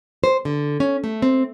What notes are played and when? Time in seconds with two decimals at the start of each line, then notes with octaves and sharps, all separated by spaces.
0.24 C5
0.45 D3
0.80 C#4
1.04 A3
1.22 C4